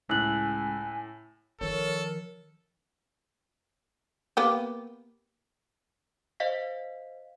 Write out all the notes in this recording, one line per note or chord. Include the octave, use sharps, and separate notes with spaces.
C#2 A2 G#5 E6 F#6 F#7
D#3 F3 A4 A#4 C#5
A#3 B3 G4
C5 D#5 F5 B6